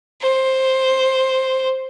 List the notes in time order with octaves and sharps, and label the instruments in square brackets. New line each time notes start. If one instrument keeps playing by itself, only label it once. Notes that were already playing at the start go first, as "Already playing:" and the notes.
[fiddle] C5